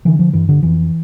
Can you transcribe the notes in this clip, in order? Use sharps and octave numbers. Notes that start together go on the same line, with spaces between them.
D3 E3
F3
G2 E3
D3
F2 E3